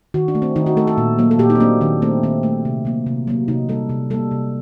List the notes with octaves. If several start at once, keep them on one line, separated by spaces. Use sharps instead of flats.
D#3 F#4
D4
A3
C4
D#3 D#4
F#4
A3 A4
A4
A#2
F#3 A#3
A4
A#2 G4
D#4
C4
F#3 A#3 D4
D#3 D4
A3 C4
D#3 C4
A3
C3
F#3 A#3
C3
F#3 A#3
C3 D#4
G3 A#3 A4
C3
G3 A#3 A4
C3